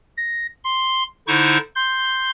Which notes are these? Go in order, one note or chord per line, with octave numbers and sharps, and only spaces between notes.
A#6
C6
D3 D#4 E4 C5 C#6
C6 G6